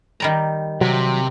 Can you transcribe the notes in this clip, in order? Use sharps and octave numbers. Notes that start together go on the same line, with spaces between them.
D#3 G3 A#5
C3 F#3